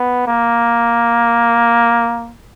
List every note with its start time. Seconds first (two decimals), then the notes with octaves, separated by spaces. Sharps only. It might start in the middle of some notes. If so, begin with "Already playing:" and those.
Already playing: B3
0.27 A#3